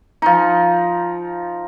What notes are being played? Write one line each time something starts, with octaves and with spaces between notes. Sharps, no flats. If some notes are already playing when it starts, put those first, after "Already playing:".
F3 D#4